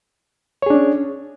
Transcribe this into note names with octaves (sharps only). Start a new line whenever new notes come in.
C#4 D4 G#4 C#5